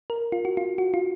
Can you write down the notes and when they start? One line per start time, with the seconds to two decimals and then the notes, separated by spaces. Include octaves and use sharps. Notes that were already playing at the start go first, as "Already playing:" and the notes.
0.10 A#4
0.32 F4
0.45 F#4
0.57 F4
0.78 F#4
0.94 F4